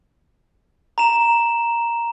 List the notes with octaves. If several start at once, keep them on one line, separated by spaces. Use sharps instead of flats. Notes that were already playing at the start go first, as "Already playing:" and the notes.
A#5 E7